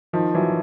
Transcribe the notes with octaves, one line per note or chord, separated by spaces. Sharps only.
D#3 F3
E3 F#3